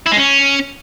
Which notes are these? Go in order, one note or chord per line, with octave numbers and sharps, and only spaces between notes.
E4
G#3
C#4